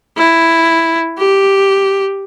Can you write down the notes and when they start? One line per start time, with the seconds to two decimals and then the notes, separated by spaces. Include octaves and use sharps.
0.17 E4
1.18 G4